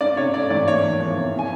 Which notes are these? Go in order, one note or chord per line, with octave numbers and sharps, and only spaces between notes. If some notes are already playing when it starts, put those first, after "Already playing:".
C#4 D5
C3 C#5
A3 D5
E3 D5
A#3 C#5
E2
F3
C3
C4
G#5